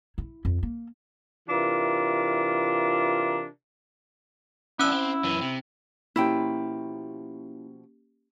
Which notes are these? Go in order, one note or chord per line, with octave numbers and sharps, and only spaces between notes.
E4
F2
A#3
C3 E3 D4 F4 A#4
B3 C#4 D4 E4 E6
C4
F#2 E3
C3
B2 F3 A#3 C#4 E4 G4 G5